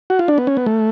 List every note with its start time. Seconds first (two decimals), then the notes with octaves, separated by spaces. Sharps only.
0.10 F#4
0.19 F4
0.28 D4
0.38 B3
0.47 C#4
0.57 B3
0.66 A3